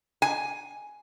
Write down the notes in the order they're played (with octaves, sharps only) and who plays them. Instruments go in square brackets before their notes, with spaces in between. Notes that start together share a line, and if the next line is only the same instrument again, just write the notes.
[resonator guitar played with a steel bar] G#5